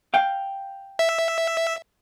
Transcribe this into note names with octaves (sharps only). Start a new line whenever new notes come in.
F5 G5
E5